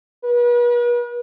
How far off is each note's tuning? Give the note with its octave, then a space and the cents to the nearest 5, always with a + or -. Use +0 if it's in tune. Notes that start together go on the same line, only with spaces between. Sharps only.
B4 -40